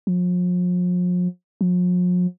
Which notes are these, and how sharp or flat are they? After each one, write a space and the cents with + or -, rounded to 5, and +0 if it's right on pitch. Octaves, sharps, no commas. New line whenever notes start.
F3 +40
F3 +45